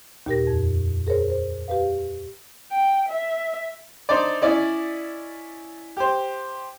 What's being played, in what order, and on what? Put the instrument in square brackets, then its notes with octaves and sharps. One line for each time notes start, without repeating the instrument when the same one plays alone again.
[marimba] D#2 A#2 G4 A#4 A#6
F2
G#4 A#4 C5 C#5
C5
G4 B4 F5
[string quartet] G5
E5
[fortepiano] D4 D#4 C5 D5
C#4 E4 D5 D#5
G4 C5